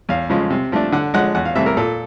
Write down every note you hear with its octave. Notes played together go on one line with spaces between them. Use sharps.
E2 F5
C#3 F3 G#3
C3
F3 A3 D4
D3 F#5
F3 G#3 F#5
E2 F#5
F5
C3 E3 A3 E5
A#4
A#2 A4